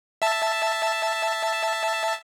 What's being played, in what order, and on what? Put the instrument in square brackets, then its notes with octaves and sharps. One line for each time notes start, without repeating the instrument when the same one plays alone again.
[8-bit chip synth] E5 A5